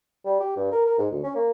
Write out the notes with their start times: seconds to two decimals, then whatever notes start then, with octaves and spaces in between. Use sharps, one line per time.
0.25 G3
0.40 G4
0.56 G2
0.72 A#4
0.86 A#4
0.98 G#2
1.11 D2
1.23 C#4
1.35 A#3